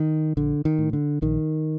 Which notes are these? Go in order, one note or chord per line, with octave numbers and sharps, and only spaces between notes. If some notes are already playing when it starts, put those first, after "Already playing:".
Already playing: D#3
A#1 D3
D#3
A2
D3
A#1 D#3